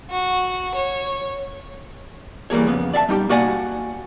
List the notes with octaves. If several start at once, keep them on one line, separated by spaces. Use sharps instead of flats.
F#4
C#5
E3 G3 A#3 G#4 C#5
F2 C#3 B3
D5 E5 F5 A5
G3 D#4 F4 G4
A#3 F#4 D5 F#5 G#5